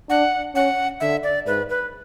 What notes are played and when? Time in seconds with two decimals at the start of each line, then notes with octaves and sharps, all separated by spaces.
0.09 D4 F#5
0.55 C#4 F#5
1.00 D3 E5
1.23 D5
1.47 G#2 B4
1.70 B4